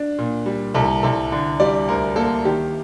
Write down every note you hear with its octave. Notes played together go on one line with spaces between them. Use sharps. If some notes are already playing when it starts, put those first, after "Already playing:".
Already playing: D4
A#2
G3
C2 A4
C2 A4
D3
G3 D5
D2 A#4
A#3 A4
D#3 G4